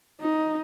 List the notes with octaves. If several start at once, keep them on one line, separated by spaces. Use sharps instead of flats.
D#4